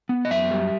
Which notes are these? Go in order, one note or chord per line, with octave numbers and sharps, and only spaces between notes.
B3
D#5
F#2 E5
G3